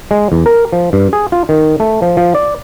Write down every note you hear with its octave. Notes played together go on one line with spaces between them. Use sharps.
G#3
E2
A#4
F3
G2
G#4
F4
D#3
A3
F3
F3
D5